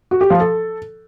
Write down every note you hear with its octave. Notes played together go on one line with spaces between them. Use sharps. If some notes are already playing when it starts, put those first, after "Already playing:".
F#4
G4
F3
A4